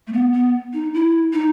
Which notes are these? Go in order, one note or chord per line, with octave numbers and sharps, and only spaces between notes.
A3
B3
B3
D#4
E4
D#4